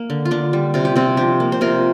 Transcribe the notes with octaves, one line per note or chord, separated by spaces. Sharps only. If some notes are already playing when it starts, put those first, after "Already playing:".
Already playing: A#3
D3
F4
D3 D4
G3
C3 F4
G4
C3 C4 F4
F3 D4 G4
A#3
C5
C3 F4 A#4